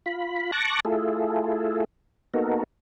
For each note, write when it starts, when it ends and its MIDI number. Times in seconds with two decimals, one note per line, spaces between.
0.06 0.51 65
0.06 0.51 83
0.52 0.80 81
0.52 0.80 85
0.52 0.80 86
0.52 0.80 90
0.52 0.80 94
0.85 1.84 57
0.85 1.84 64
0.85 1.84 65
0.85 1.84 68
0.85 1.84 69
2.34 2.63 58
2.34 2.63 59
2.34 2.63 63
2.34 2.63 66
2.34 2.63 69
2.34 2.63 70